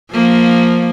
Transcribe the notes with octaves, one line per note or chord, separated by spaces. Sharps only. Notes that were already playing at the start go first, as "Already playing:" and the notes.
F3 A#3